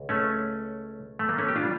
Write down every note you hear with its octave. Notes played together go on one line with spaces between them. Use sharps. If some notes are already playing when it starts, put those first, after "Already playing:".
Already playing: C#2
A3 C#4
A3
A#3
A3 C#4
G4
D4 F4
G3